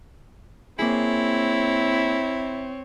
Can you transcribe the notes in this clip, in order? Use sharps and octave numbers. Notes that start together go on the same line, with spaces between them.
A#3 C4 E4 G#4 C#5